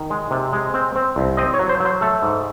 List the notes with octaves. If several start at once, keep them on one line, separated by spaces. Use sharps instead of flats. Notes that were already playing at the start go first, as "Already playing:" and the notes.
Already playing: D#3
G#3
C3
G#3
C4
C4
C2
C4 D#5
C#5
F#3
C5
F#3 C5
A3 A4
G#2